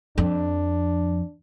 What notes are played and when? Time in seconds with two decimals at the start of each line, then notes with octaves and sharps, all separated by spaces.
0.18 F2 D4